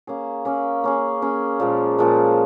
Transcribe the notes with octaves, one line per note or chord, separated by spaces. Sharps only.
A#3 C#4 G#4
A#3 C#4 G#4
A#3 C#4 G#4
A#3 C#4 G#4
A#2 F3 G#3
A#2 F3 G#3